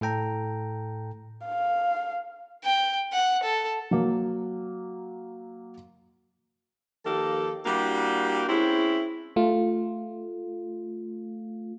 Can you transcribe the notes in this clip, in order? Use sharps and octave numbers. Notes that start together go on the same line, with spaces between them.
A2 A4 G5 A#5
F5
G5
F#5
A4
F#3 A#3
D#3 F3 A#3 G4 A4
G3 A#3 D4 E4 F#4 G4
G#3 C4 C#4 E4
A3 F4